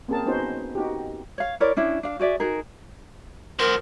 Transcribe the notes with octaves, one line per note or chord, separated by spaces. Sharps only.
A#3 C4 C#4 G#4 A#4 A5
B3 C#4 D#4 F#4 C5
D#4 F#4 G4
C#5 F5
E4 A#4 C#5 D5
C#4 D4 E4
D4 F5
F#4 G#4 D5 E5
D#4 F#4 G#4 A#4
F#4 A#4 C5